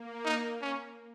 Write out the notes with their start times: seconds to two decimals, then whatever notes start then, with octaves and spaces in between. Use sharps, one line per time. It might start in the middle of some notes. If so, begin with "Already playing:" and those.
Already playing: A#3
0.25 D#4
0.62 C#4